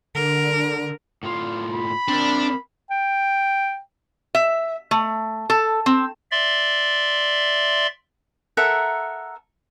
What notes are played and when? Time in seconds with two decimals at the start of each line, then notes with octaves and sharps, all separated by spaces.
0.15 D3 A#4
1.23 A2 F4
1.74 B5
2.08 C4 D4 A#4
2.91 G5
4.35 E5
4.91 A3
5.50 A4
5.86 C4
6.31 D5 E5 C6
8.57 A4 A#4 E5 F#5